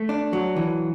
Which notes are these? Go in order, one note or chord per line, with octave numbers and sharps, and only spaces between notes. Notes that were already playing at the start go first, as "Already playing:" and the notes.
Already playing: A3
D4
F#3
E3